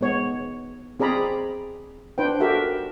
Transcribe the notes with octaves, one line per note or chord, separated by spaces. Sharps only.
G#3 B3 C#5
C4 G#4 D5 A#5 B5
D4 B4 C5 G5
F#4 G4 A4 A#4 E5